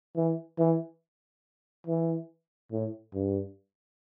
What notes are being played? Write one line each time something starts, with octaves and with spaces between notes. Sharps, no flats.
E3
E3
E3
A2
G2